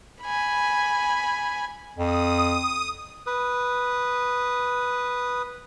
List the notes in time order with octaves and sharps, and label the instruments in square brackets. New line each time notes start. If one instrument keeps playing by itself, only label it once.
[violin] G#5 B5
[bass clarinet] F2 [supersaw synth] D#6
[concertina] B4 D#6